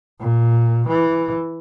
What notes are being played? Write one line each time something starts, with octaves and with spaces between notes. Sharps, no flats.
A#2
E3